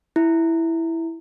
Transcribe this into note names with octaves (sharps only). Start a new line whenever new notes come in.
E4